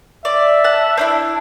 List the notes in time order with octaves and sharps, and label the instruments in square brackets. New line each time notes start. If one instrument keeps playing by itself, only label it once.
[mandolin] D5 [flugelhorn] E5
[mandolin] F#5 A5
C4 D4 E4